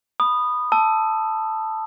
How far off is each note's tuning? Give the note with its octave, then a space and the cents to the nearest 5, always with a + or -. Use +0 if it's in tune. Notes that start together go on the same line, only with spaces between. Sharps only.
B5 +0 D#6 -15
A5 +0 E6 +0